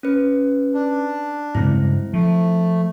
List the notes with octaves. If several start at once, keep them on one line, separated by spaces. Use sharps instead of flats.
C#4 B4
D4
G2 C#3 G#3 C4 E4
F3 A3